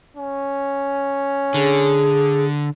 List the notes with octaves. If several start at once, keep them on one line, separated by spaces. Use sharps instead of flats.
C#4
D3 G#4